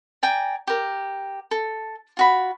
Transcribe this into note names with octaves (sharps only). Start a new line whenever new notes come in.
D5 G5 G#5 A#5
G4 A#4
A4
F4 F#4 B5